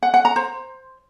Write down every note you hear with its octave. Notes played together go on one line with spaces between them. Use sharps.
F#5
F#5
A#5
C5